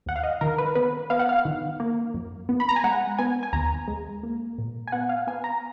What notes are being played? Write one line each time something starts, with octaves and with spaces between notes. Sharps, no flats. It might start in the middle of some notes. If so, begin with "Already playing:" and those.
D#2 F#5
F5
D#5
D#3 A#4
B4
B3 B4
B3 F5
F#5
F5
D#3
A#3
F#2
B3
B5
A#5
G#5
G#3 F#5
B3 G#5
G#5
D#2 A#5
G#3
A#3
A#2
G#5
B3 F#5
F5
B3 G#5
A#5